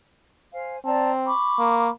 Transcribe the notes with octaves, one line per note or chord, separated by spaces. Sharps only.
C5 F5 G#5
C4 D5 A5 A#5
B5 C#6 D6
A#3